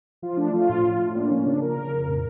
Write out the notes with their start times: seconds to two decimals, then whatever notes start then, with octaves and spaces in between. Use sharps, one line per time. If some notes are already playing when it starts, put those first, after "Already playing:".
0.22 F3 F4
0.37 A3 D4
0.53 F3 F4
0.69 A2
0.84 A2
0.99 A2
1.15 A#3 D4
1.30 F3 C#4
1.45 C#3 D4
1.61 C#3 A#4
1.76 C#3
1.92 F2
2.08 A2